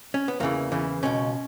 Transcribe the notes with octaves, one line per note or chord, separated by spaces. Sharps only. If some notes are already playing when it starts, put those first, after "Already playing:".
C#4
B3
E2 C#3 E3 A#3
E2 C#3 E3
C#2 B2 C#4